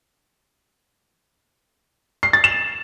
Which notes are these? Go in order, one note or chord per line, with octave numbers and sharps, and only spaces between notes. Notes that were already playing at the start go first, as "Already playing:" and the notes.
C7
A6
E7